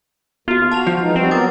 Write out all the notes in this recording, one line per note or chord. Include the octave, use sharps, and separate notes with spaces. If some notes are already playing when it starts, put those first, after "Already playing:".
D#2 B3 F4 F#4
F#4 A5 F6 F7
F3
E3 G#3 D#4
G3 C4 F#4
F#3 B3 A#4 D6 D#6 A6